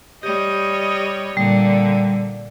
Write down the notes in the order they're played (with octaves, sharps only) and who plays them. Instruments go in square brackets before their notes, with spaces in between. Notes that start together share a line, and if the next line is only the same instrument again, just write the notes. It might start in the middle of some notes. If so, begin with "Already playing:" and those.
[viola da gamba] G3 C#5 D#5 [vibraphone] G4
[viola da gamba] A#2 D3 [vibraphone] G3